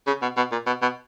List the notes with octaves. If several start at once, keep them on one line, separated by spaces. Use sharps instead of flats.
C#3
B2
B2
A#2
B2
B2